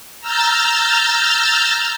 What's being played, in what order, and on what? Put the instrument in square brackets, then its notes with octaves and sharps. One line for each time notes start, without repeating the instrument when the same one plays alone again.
[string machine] A#5 E6 F6 G6 A6